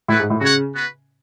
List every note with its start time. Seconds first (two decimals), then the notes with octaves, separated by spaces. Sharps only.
0.08 A2 A3 E4 B4 F#5
0.20 G#2
0.30 A2
0.41 C#3 F#4 C#5 F#5
0.73 B3 F#4 B4